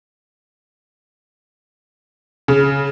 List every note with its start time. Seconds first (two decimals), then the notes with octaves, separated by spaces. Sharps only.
2.48 C#3